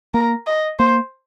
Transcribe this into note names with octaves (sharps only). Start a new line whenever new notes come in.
A#3 A#4
D#5
A#3 C5